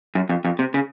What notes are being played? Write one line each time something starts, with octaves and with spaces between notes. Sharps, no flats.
F#2
F2
F2
C3
C#3